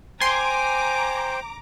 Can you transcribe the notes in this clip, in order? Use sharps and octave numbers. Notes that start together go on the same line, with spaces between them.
C5 G5 G#5 A#5 C6 D6